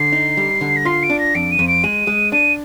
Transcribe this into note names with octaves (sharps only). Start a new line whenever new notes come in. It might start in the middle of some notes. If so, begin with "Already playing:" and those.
Already playing: D3 C7
D#4
G3
D3
A#6
F4 C7
D7
D4
A#6
F2 D7
D#7
F2
D7
G#3 D#7
G#3
D4 D#7